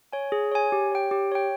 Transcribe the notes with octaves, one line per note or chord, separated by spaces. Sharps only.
C#5 G#5
G#4
C#5 G#5
G4
C#5 G5
G4
C#5 G5